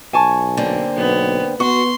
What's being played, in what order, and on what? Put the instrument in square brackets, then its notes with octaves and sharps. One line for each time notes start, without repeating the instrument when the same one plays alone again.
[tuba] B1 [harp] G#5 A5 C#6
[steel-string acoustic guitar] D3 A#3 C4
[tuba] B1 [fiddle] B3
[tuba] B3 [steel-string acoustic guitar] F#4 [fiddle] C6 [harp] C#6